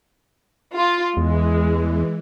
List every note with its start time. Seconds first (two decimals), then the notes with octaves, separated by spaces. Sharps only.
0.75 F4
1.17 E2 E3 G#3